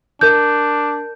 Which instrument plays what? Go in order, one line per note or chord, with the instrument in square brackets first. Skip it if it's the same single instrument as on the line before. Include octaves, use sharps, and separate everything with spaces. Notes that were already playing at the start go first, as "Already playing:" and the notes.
[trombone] D4 [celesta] A#4 G6